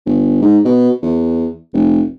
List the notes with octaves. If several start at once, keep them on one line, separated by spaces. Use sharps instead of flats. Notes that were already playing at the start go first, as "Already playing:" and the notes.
G1
G#2
B2
E2
F1